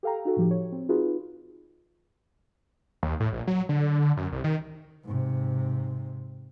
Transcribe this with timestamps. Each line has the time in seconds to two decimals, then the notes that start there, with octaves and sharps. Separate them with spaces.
0.03 G4 A4 F5 G5 A#5
0.25 D#4 F#4 A4
0.37 A2 F3 G4
0.51 C#5
0.72 C4
0.89 D#4 F4 F#4 G#4 B4
3.03 D#2
3.20 A2
3.33 A#1
3.47 F#3
3.69 D3
4.17 F#2
4.32 C2
4.44 D#3
5.04 G#2 C3